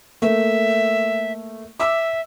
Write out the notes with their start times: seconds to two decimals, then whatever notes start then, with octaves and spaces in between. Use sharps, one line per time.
0.22 A3 A#3 E5
1.80 E5 D6 E6